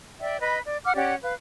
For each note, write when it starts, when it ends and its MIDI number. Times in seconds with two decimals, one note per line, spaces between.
0.19 0.40 74
0.19 0.40 76
0.19 0.40 79
0.40 0.59 71
0.40 0.59 75
0.40 0.59 83
0.65 0.78 74
0.84 0.93 78
0.84 0.93 86
0.84 0.93 89
0.96 1.14 61
0.96 1.14 67
0.96 1.14 74
0.96 1.14 78
1.22 1.34 71
1.22 1.34 77